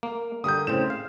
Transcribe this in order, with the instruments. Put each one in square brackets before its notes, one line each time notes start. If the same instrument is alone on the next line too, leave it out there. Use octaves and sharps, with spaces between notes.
[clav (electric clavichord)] A#3
[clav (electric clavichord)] D3 G3 A#4 [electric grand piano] D#6 G6
[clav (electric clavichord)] A2 C#3 C4 [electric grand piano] E7
[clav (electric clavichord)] F5